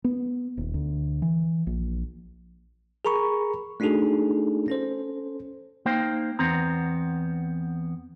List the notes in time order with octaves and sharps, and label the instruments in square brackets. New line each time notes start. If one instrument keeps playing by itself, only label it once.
[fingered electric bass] B3
D#1
D2
E3
A#1
[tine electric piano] G#4 A#4 A#5 B5 C#6
A3 D4 D#4 F#4 G#4 A4
C#4 A4 C5
[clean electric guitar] A#3 D#4 C5 G5
E2 B3 C4 A#5